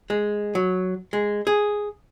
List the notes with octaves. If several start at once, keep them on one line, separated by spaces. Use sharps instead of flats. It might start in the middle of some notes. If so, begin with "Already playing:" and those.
G#3
F#3
G#3
G#4